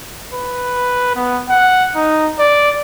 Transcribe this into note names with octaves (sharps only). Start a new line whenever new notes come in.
B4
B3
F#5
D#4
D5